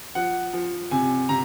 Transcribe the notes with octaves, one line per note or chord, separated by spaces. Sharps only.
F3 F#5
F3
C3 G#5
C3 A#5